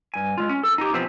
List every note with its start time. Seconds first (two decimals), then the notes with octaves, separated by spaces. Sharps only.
0.14 G2 G#5
0.38 G#3 F4
0.49 C#4
0.63 A4
0.78 D#4 G4
0.93 B2 E3 F3 C4 G4 A5